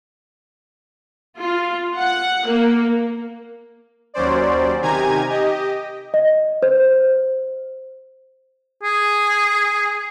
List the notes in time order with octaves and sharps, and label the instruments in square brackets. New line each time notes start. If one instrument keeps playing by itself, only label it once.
[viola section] F4
F#5
A#3
[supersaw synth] D#2 F#3 C#4 C5 D5
C3 D#3 G4 G#5 A#5 G#6
G4 D#5
[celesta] D#5
C5
[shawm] G#4